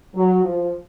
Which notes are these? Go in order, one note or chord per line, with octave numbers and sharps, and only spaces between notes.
F#3
F3